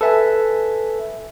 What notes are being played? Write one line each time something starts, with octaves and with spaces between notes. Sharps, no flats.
A4 B4 E5 G#5